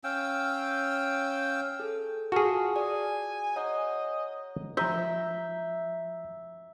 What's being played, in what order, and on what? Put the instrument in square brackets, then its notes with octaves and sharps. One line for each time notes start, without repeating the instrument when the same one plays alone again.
[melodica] C#4 F5 G5 E6
[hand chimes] G#4 A4
[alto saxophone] F4 [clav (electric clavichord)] F#4 G#4 [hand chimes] A5 C#6 F6
[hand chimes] D5 D#6 [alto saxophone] G#5
[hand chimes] C#5 F#5 A#5 [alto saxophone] D#5
[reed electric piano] F3 A#5 G6 [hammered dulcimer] E5